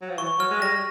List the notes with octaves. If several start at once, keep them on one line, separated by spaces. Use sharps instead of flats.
F#3
F3
E3 C#6
F#3 F6
G#3
G3 A#6